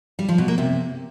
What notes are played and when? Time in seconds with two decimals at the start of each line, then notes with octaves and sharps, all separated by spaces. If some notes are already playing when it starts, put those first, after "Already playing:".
0.19 G3
0.28 F3
0.38 B2
0.48 A#3
0.58 C3